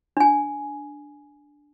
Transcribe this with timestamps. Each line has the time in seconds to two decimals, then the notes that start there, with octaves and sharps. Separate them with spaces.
0.17 D4 G#5